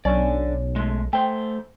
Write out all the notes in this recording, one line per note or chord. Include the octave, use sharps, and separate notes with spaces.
B1 D3 C#4 D5
G#3 A3
A3 C5 G5